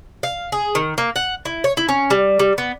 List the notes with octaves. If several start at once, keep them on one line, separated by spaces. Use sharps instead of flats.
F5
G#4
D#3
A#3
F#5
E4
C#5
E4
C#4
G3
G3
B3